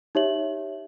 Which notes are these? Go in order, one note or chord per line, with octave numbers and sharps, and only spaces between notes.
D#4 G4 C#5 E5 F#7